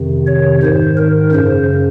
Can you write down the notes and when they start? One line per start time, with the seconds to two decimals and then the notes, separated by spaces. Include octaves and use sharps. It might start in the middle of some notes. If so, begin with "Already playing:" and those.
Already playing: F2 C3 D#3
0.27 C#5
0.63 G#2 D#3 C5
0.97 A#4
1.32 F#2 C#3 C5